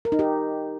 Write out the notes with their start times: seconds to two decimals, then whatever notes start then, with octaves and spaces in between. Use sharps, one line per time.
0.05 A#4
0.12 D#4
0.19 G4